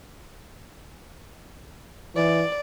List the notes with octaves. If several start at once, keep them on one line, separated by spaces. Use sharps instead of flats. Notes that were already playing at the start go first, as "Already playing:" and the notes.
E3 D5